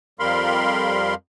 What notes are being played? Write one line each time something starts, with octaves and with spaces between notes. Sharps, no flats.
F2 G3 A#4 F5 B5 C6